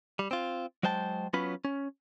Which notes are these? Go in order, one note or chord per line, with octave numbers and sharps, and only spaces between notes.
G3
C4 F4
F#3 G#3 C5 G5 A5
F#3 B3 C#4 F4 B4 B5
C#4